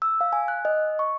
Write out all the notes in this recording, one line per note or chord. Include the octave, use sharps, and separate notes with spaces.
E6
F5
G#5
F#6
D#5
C#6